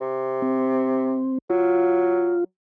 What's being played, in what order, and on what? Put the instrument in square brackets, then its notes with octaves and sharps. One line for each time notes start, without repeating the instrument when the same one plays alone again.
[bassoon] C3
[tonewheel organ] C4
[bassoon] F#3 [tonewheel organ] F4